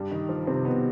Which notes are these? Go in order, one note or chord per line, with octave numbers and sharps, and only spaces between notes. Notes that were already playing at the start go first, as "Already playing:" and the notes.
Already playing: G2 G3
D#3
F3
C3 C4
B2 B3